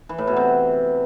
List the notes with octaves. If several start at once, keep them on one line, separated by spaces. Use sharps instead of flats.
E3
A2
B2
C3